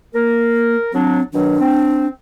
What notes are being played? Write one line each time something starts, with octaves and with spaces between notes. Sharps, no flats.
A#3 A#4
F#3 C4 D4
B2 D#3 F#3 D4
C4